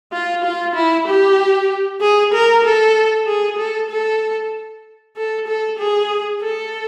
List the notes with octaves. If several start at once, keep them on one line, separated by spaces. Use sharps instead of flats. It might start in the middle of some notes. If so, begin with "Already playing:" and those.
F4
F4
E4
G4
G#4
A#4
A4
G#4
A4
A4
A4
A4
G#4
A4